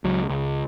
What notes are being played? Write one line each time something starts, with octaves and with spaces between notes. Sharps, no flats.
C#2 F#3
C#2